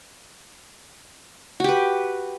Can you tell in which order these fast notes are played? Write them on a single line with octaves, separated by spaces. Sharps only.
F#4 G4 B4